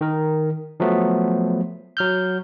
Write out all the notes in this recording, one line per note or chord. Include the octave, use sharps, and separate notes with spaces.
D#3 A#4
F3 F#3 A3 B3
F#3 F6 G6